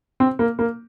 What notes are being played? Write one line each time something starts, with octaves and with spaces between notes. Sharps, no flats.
C4
A#3
A#3